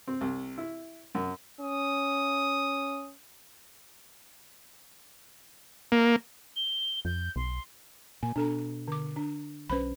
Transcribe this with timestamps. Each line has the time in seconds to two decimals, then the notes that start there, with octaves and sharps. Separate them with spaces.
0.07 C4
0.21 C2
0.58 E4
1.15 F#2
1.60 C#4 D#6
5.92 A#3
6.56 G7
7.05 F2 G6
7.36 B1 C6
8.23 A#2 G#5
8.36 B2 D4 A4 A#5
8.88 D3 D6
9.16 D4 A#5
9.70 B1 C#4 B4 C5 B5